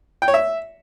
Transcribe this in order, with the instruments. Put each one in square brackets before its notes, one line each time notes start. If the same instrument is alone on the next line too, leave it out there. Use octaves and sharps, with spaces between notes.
[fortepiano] G5
C#5
E5